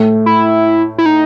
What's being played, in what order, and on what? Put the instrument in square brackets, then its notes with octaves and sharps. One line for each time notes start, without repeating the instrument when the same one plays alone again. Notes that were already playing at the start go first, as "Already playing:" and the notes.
Already playing: [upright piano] A2 A3
[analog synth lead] E4
E4
D#4